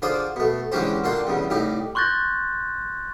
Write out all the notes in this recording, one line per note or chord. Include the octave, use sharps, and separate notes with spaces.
D3 F4 G#4 C5 D5
B2 A3
D3 E3 G#3 C#4 G4 C5
A#2 D3 D4 G5 C6
E2 G2 C#3
C2 A2 D#4 G4
C6 C#6 F#6 G6 A6 A#6